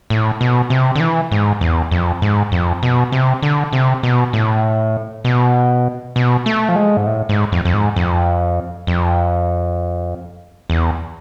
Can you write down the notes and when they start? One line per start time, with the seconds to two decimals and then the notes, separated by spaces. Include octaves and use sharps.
0.10 A2
0.41 B2
0.70 C3
0.96 D3
1.00 E3
1.32 G#2
1.61 E2
1.91 F2
2.22 G#2
2.52 F2
2.83 B2
3.12 C3
3.42 D3
3.73 C3
4.03 B2
4.33 A2
5.25 B2
6.16 B2
6.46 A3
6.69 F3
6.76 G#3
6.97 G#2
7.07 A2
7.29 G#2
7.52 F2
7.65 F2
7.74 G#2
7.96 F2
8.87 F2
10.70 E2